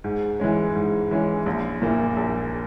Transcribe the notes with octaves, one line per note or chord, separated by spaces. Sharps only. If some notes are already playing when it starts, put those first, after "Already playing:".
G#2
E3 G#3 C#4
G#2
E3 G#3 C#4
A#1
A#2 A#3 E4
A#1